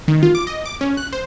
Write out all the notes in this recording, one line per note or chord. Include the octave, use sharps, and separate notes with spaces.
D#3
F4
D6
D#5
D6
C#4
F#6
C5